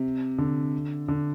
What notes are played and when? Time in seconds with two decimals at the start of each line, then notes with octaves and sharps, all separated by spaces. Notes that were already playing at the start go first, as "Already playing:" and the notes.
Already playing: C3
0.38 D3
1.08 D3